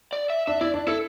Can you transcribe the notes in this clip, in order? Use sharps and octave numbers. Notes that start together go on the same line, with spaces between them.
D5
E5
D4 E5
E4 D5
D4
E4 A4